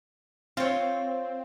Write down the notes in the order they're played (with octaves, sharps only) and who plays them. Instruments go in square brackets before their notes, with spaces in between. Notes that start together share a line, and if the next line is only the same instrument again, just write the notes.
[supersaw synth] C4 [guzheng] F4 C#5